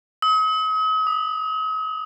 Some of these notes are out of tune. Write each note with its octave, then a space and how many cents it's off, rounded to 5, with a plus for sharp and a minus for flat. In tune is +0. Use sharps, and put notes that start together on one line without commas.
D#6 +40
D#6 -25